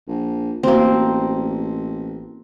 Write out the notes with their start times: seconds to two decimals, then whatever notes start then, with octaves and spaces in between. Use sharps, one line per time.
0.08 A#1
0.63 A1 A#3 C4 F#4 C5